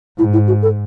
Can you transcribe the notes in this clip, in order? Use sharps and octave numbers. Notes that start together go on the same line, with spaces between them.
G#2 E4
E4
F#4
A4